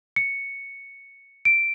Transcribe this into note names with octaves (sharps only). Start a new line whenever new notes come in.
C#7
D7